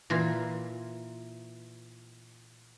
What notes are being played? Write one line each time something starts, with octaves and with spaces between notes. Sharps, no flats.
A#2 E3 F4